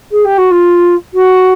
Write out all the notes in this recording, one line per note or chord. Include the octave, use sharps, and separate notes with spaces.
G#4
G4
F#4
F4
F#4